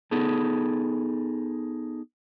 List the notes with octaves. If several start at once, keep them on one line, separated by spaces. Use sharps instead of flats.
B3 D#4 G#4 A4